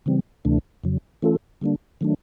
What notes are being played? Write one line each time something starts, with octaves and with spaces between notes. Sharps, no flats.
C#3 E3 G3 C4
D2 C3 E3 A3 D4
F2 C#3 F#3
E3 A3 C#4 F4 A4
D3 G3 A#3 D4
D#3 F#3 A3 D4